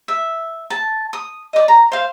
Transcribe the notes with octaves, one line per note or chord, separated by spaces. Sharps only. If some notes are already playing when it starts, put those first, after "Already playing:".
E5
A5
D#6
D5 D#5
A#5
C5 F5